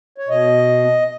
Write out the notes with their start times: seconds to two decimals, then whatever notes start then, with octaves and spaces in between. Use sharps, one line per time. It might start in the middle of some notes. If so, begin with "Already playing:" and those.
0.18 C#5
0.29 B2 D#5